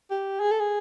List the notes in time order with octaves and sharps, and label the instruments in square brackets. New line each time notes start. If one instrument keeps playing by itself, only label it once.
[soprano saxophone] G4
G#4
A4
G#4